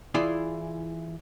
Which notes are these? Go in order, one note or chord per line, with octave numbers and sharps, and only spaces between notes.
E3 E4 F4 G#4 D5